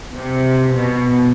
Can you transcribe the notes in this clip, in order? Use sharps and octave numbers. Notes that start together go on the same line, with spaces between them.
C3
B2